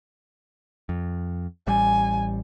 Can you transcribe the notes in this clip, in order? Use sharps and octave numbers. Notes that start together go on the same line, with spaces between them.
F2
A1 G3 G#5